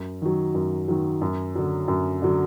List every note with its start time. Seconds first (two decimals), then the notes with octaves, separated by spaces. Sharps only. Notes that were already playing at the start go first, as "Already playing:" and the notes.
Already playing: F#2
0.22 D#3 F#3
0.54 F#2
0.88 D#3 F#3
1.21 F#2
1.55 D3 F#3
1.88 F#2
2.22 D3 F#3